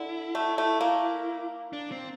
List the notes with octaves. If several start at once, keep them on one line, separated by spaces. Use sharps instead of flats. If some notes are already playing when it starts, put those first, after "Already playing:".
Already playing: D3 E4
A3
A3
A#3
D4
C4